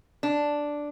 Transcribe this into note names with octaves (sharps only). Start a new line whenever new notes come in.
D4